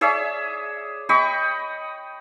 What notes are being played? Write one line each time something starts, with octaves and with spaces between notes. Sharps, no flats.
G#4 C#5 D5 E5
D#5 G5 B5 C#6